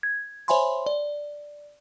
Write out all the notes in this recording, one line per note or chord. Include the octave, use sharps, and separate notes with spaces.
G#6
C5 C#5 E5 G#5 B5 C6
D5